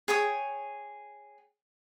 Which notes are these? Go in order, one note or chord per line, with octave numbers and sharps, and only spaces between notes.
G#4 C#5 G5 D#6